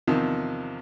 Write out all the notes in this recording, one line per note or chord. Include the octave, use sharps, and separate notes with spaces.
E2 C3 D#3 F3